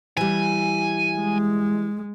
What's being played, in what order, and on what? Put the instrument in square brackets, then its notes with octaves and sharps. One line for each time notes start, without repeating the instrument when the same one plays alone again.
[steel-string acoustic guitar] E3 G3 [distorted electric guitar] G#5
[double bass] G#3